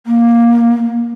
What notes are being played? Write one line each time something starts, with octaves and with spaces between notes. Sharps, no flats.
A#3